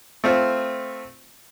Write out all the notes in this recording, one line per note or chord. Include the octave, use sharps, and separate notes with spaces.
A3 C4 F4